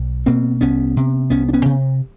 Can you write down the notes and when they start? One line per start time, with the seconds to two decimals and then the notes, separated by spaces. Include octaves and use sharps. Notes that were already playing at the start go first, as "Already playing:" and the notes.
Already playing: B1
0.26 B2 A#3 C4
0.61 C2 B3 C#4
0.97 C3
1.30 C2 B3 C#4
1.49 D4
1.53 B3 C#4
1.65 C3